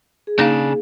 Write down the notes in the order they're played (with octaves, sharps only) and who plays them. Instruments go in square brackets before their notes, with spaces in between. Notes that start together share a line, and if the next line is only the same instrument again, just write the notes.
[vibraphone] G#4
[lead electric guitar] C#3 D4 [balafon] A#3 D#4 F5